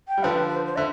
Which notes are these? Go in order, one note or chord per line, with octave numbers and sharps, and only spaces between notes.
G5
G3
D3 F3 B4
B4
C5
C5
D3 E5